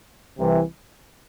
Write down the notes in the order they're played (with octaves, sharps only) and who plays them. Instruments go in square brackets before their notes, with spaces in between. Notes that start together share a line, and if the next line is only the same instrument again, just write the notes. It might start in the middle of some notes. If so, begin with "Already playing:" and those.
[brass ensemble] C2 C3 E3